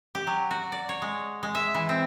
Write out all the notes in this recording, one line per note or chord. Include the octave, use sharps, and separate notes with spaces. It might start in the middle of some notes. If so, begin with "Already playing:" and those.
G4
F#3
F#4
D5
C#5
G#3
G#3
E5
E3
C4